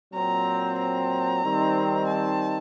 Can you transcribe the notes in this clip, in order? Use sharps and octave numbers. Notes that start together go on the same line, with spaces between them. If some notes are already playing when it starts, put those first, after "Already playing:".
A#2 F#3 C4 A#5
A#5
D#3 G3 C4 D#4
A5